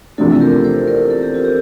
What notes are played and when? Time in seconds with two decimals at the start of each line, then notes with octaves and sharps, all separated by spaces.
0.18 E2 C3 F3 A3 D4 F4 A4
0.41 G4 A#4
0.64 A4 C5
0.88 A#4 D5
1.10 A4
1.23 G4
1.34 F4
1.45 E4 G4